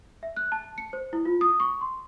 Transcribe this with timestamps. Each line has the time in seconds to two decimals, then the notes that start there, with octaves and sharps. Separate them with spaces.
0.23 E5
0.37 F#6
0.52 A5
0.78 C#7
0.93 C5
1.13 E4
1.25 F4
1.41 D#6
1.60 C#6
1.81 C6